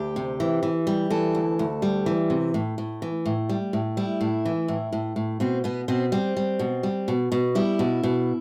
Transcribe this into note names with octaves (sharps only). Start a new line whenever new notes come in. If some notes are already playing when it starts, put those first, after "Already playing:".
Already playing: D2 G4
C3
E3
E3
G3
E3 A4
D2
D2
G3
E3
C3
A2
A2
E3
A2
G3
A2
G3 E4
A2
E3
A2
A2
A2
B2 C4
B2 B3
B2 C4
G3 C4
G3
B2
G3
B2
B2
G3 E4
B2
B2